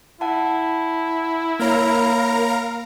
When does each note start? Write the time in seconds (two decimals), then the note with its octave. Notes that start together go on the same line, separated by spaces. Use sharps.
0.21 E4 F#5 A5
1.59 A#3 A#4 C#5 F5 A#5 B5